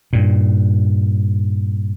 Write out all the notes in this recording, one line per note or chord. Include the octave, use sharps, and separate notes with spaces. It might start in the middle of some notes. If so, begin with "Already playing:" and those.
G2 A#2